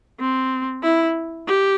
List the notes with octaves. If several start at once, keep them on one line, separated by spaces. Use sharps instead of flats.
C4
E4
G4